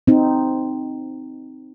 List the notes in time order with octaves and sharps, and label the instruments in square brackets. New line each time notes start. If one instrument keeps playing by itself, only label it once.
[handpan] C4 D#4